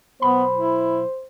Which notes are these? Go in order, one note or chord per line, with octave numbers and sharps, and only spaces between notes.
B1 B3 C5 B5
E4